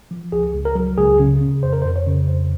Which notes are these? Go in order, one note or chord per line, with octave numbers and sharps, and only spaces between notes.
F3
C#2 G#4
C#2
A#4
F#3
C#2 G#4
C#3
C#3
F2 C5
A#4
F2 C5
C#5
C#3
F2 C5